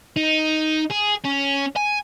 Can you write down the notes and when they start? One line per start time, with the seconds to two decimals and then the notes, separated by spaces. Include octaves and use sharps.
0.16 D#4
0.91 G#4
1.25 C#4
1.76 G#5